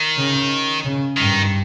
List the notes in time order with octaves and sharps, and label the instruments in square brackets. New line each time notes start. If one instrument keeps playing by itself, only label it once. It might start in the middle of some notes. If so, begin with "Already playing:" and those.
Already playing: [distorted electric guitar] D#3
[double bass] C#3
C#3
[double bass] G2 [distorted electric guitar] D#3